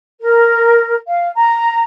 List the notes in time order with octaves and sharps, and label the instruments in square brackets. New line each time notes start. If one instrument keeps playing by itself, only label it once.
[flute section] A#4
F5
A#5